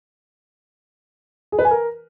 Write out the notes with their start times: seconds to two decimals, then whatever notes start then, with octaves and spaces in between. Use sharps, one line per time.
1.52 G#4
1.59 B4
1.65 G#5
1.71 A#4